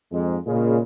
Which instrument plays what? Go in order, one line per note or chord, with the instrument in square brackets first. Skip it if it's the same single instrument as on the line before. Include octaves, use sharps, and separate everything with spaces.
[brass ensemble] F2 G#2 G#3
A#2 C#3 G#3